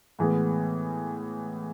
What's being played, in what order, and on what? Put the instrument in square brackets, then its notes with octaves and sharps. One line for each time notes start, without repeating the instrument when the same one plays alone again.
[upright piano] A2 E3 G#3 B3